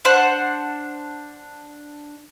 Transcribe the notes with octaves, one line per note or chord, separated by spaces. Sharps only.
D4 C5 F#5